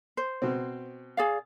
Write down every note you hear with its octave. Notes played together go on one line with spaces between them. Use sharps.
C5
B2 C4
G#4 D5 F5